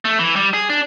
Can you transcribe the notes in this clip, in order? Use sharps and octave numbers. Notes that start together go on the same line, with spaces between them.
A3
E3
G3
G#4
D4